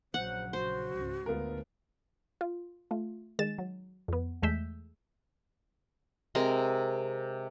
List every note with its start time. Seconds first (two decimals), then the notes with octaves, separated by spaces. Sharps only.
0.14 A#1 C#3 F#3 C5 F#5
0.53 F#4 C5
0.94 C#2 G#2 C#4
1.26 D2 G#3 B3 F4 A#4
2.41 F4
2.91 A3 F4
3.39 D#3 G#3 G#4 A6 E7
3.58 F#3
4.08 F2 B3
4.42 E2 G#3 A3 E6 G6 B6
6.35 C3 G#3 A#4